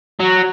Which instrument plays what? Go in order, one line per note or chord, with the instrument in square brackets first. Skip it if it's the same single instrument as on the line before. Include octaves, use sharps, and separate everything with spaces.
[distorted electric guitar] F#3